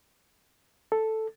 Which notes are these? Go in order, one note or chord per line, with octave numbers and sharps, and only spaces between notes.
A4